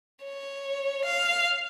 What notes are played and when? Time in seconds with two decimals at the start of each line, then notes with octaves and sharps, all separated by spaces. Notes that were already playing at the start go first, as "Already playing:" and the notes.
0.24 C#5
1.05 F5